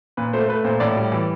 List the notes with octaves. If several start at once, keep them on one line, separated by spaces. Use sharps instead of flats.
A#2 B4
A3 C5
A3 B4
A#2 C5
A2 D5
G3
E3